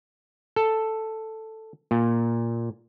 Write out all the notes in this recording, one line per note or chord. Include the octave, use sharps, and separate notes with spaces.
A4
A#2